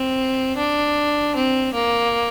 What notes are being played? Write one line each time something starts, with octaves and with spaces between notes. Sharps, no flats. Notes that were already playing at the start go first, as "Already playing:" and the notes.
Already playing: C4
D4
C4
A#3